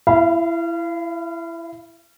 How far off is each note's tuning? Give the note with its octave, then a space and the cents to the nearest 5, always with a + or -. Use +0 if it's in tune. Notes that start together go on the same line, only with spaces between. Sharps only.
E4 +20 F5 -30 B5 -10